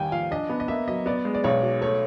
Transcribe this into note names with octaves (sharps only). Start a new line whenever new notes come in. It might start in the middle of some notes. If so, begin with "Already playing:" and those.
Already playing: D#2 G3 G5 G#5
F3 F5
D4 D#5
B3
D#5
A#3 E5
F#3 D#5
B3 D5
G#3
D5
B1 C#5
F#3
A3 C#5